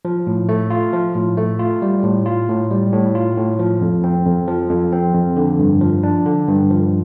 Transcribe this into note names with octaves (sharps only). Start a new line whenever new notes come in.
F3
A2
A3
F4
F3
A2
A3
F4
G3
A2
F4
A2
G3
A2
F4
A2
F3
F2
C4
F2
F3
F2
C4
F2
D3
G2
F3
D4
D3
G2
F3